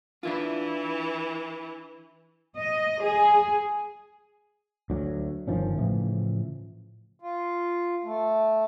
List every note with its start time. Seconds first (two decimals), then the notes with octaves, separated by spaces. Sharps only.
0.23 E3 D4 E4 F4
2.58 D#5
3.04 G#4
4.90 D2 F#3
5.48 G1 D#3 F3 C#4
5.78 A2 C#3 E3 F3
7.20 F4
8.04 A3